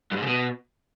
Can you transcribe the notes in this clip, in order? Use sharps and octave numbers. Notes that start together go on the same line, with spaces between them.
G2
G#2
C#3
B2